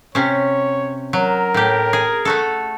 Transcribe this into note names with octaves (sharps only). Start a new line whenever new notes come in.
C3 C#4 C#5
F#3 A#4
A2 G4
G#4
A3 F#4 A4